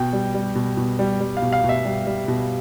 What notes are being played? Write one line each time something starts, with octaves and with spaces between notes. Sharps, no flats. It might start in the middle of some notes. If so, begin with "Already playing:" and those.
Already playing: B2 G5
G3
G3
B2
B2
G3
G3
F5
B2
F5
B2
E5
G3
G3
B2